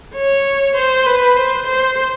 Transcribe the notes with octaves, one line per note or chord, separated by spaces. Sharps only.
C#5
C5
B4
C5
C5